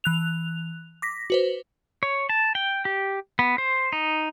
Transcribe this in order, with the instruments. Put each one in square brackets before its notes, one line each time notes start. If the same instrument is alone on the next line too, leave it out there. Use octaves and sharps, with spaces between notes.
[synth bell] E3 F#6 F7
D6 A#6 B6
F#4 B4 C5
[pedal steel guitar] C#5
A5
G5
G4
B3
C5
D#4